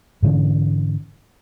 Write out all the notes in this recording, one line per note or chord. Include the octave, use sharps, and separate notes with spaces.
G#2 D3 E3 C#4